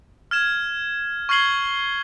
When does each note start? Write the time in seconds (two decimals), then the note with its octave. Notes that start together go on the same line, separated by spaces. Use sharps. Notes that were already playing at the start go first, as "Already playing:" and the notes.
0.31 F6 G#6 E7
1.29 C#6 F6 G#6 C7 F#7 G7